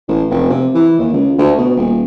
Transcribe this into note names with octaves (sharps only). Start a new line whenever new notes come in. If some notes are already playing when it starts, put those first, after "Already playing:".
A1
F1
C3
E3
D#2
C#2
D2
B2
D#1